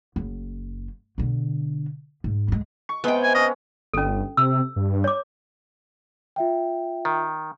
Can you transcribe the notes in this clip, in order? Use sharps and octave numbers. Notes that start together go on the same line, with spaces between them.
F#1
B2 D3
G#2
D2 G#3
C#6
C3 G#3 B3 G5
G#5
C#4 D#5
G1 C#4 A4
C3 E6
G2
C#5 D6
F4 E5 G5
D#3